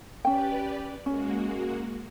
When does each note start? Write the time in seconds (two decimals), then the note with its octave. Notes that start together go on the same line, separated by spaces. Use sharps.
0.25 C#4 G4 B4 D5 G5
1.06 G#3 A#3 C#4 F#4